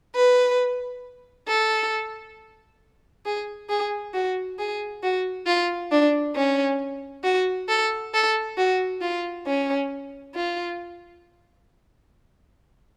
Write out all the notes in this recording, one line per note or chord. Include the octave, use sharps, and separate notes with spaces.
B4
A4
G#4
G#4
F#4
G#4
F#4
F4
D4
C#4
F#4
A4
A4
F#4
F4
C#4
F4